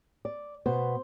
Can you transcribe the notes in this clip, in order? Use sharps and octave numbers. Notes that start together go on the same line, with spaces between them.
D5
B2 B3 C5